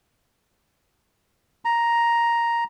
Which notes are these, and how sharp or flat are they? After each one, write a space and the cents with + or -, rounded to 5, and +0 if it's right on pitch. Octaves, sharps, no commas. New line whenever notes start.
A#5 +5